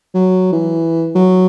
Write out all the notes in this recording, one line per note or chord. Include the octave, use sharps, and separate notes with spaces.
F#3
E3
F#3